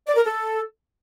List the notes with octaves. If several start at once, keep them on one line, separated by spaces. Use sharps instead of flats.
D5
A#4
A4